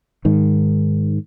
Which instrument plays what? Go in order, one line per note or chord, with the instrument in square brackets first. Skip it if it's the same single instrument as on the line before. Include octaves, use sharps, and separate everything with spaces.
[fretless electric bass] G#2 D#3